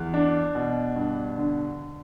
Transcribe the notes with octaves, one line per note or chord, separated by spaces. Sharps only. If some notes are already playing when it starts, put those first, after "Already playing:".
Already playing: E2
D4
B2
G2
D3